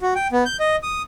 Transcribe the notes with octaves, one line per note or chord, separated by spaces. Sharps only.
F#4
G5
B3
G6
D#5
D#6